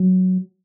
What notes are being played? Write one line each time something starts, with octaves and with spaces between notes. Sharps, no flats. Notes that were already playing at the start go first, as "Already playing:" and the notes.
Already playing: F#3